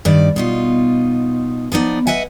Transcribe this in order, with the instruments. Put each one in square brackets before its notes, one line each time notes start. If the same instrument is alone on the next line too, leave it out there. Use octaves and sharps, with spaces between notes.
[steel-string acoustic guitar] G2 D#3 D5
B2 D#4 F4
F3 B3 D#4 D5
B4 D#5 E5 F#5 G#5